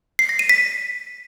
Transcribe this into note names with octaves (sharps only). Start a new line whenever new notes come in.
C7
A#6
D#7
B6